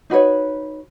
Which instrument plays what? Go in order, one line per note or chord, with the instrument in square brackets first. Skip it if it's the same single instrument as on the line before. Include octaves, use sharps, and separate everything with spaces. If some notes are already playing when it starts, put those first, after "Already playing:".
[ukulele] D#4 F#4 B4 C#5